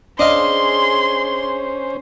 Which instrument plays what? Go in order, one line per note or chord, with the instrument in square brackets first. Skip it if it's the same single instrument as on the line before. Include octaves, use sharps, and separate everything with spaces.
[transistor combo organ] C#4 C5 [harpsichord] D4 D#5 F5 [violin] G#4 C6